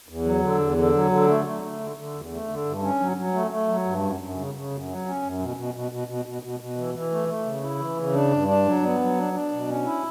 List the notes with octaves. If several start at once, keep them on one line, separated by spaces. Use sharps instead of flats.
E2
F#3
D3
E2
D3
F#3
D3
A3
A3
A3
D3
D3
E2
A3
D3
G2
C#4
F#3
F#3
A3
A3
F#3
G2
F#2
F#2
C#3
C#3
F#2
F#3
C#4
F#2
B2
B2
B2
B2
B2
B2
B2
B2
E3
E3
A3
A3
C#3
E4
E3
C#3
D4
G2
D4
F#3
B3
F#3
D4
D4
B2
C#4
E4